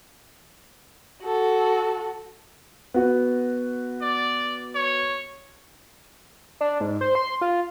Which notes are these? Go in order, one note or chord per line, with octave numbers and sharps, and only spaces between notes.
F#4 A4
B3 F#4
D5
C#5
D4
G#2
C5
C6
F4